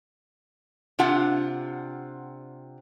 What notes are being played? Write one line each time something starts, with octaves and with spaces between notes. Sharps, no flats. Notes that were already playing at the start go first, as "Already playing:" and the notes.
C3 D4 F4 F#5